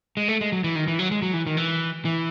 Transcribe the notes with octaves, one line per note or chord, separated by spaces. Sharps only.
G#3
A3
G#3
F#3
E3
D#3
E3
F#3
G#3
F#3
E3
D#3
E3
E3